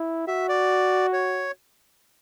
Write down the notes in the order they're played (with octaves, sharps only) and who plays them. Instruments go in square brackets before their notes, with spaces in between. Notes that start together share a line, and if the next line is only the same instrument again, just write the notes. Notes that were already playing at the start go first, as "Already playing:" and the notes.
Already playing: [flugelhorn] E4
[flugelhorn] F#4 [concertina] E5
[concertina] D5
C#5